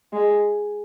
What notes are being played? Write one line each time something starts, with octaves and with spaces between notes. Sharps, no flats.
G#3